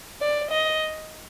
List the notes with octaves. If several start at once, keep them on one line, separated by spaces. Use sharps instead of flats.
D5
D#5